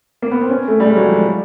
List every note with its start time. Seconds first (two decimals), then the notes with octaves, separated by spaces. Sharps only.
0.22 A#3
0.31 B3
0.41 C4
0.50 C#4
0.68 A3
0.80 G3
0.86 G#3
0.97 F#3
1.09 F3